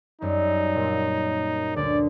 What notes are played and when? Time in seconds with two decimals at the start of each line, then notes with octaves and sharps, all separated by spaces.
0.22 F#2 G3 D#4
0.75 A#2
1.76 D2 D5